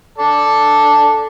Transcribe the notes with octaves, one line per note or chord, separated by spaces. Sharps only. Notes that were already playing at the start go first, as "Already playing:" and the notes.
A4 D5 A5